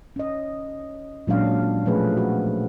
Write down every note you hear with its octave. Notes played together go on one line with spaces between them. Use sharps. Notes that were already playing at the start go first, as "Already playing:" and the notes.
C#4 D#5
A#2 F#3 G#3 C#4 D4 F5
B2 F3 A3 C#4 G#4 B4
F#4